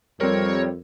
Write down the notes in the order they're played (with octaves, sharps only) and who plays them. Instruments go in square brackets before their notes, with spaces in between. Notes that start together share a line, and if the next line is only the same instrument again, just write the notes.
[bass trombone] F2 [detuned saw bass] G3 [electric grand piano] C4 A#4 [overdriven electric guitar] C#5